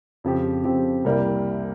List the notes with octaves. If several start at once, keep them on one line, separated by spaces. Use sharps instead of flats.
F2 C#3 F3 C4 G4
F2 C#3 F3 C4 G4
C2 C3 G3 A#3